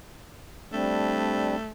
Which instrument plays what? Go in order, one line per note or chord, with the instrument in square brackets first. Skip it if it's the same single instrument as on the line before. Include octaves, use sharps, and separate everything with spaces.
[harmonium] G3 C4 D4 [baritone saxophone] A3